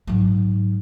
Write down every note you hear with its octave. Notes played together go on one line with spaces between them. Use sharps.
G#2 F#3